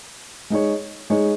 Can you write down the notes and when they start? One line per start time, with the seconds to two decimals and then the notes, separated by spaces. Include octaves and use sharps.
0.50 G#3 D#4 G#4 C#5
1.10 G#3 D#4 G#4 C#5